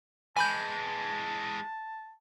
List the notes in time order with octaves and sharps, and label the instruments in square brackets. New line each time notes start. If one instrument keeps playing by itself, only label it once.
[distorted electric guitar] E3 G#3 [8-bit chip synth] G#5 B5 G6 [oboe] A5